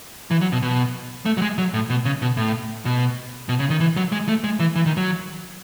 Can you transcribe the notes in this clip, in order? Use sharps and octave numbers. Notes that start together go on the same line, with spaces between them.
E3
F#3
B2
B2
A3
F#3
G#3
F#3
A2
B2
C#3
B2
A2
B2
B2
C#3
D#3
E3
F#3
G#3
A3
G#3
E3
E3
D#3
F#3